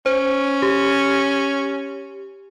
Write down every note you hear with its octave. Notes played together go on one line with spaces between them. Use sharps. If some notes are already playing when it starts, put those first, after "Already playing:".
C#4 C5
G4